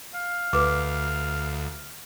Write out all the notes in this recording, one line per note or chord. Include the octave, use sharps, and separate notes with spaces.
F5
D2 B4 D6